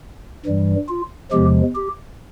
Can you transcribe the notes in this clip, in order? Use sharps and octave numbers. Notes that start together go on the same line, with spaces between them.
G2 E3 G3
F4
E2 C3 F3 G#3 G4
G4